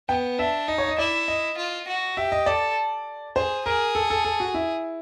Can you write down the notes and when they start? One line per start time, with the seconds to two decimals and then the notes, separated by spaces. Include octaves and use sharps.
0.09 B3 G5
0.39 D4 E5
0.68 D#4 D#5
0.78 C#5
0.89 D#5
0.98 E4 D5
1.28 D#5
1.57 F4
1.87 F#4
2.17 G4 E5
2.32 D#5
2.46 A4 D5
3.36 G#4 C5
3.66 G#4 A#4
3.95 A4
4.10 A4
4.25 A4
4.40 F#4
4.54 E4